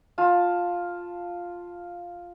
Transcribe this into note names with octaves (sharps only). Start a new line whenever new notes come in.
F4 A5